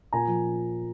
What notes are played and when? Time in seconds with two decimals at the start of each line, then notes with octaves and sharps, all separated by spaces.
0.12 A#2 G#5 A#5
0.27 F3